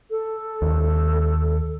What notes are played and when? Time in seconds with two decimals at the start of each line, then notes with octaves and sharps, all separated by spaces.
0.11 A4
0.62 D#2